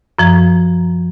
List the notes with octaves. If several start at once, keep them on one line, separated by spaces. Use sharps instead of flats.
F#2 F3 A#5 G#6